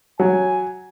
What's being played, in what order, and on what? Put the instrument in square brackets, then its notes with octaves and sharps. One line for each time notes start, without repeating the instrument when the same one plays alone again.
[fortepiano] F#3 [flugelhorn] G#5